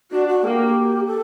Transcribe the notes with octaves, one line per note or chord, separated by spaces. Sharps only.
D4 F#4
F#4
A#3 G4 A4
A4